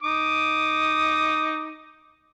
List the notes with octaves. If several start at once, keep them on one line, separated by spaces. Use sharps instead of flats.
D#4 D6 D#6